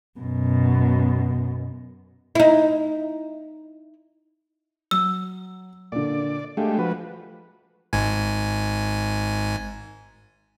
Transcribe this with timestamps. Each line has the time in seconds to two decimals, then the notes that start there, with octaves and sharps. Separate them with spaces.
0.19 F#2 B2
2.35 D#4 E4
4.91 F#3 E6
5.92 A#2 D3 D5
6.57 G#3 A3 D4 G4 F5
6.79 F3 F#4 B4
7.93 G#1 G#2 G#5